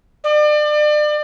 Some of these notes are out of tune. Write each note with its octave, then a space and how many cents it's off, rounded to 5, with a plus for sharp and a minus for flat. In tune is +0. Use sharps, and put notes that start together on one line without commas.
D5 +35